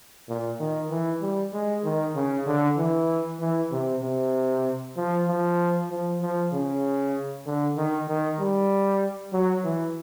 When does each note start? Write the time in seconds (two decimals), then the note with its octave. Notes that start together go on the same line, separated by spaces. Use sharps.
0.29 A#2
0.60 D#3
0.91 E3
1.22 G3
1.53 G#3
1.84 D#3
2.15 C#3
2.47 D3
2.78 E3
3.40 E3
3.72 C3
4.03 C3
4.97 F3
5.28 F3
5.90 F3
6.21 F3
6.53 C#3
7.46 D3
7.77 D#3
8.08 D#3
8.40 G3
9.33 F#3
9.64 E3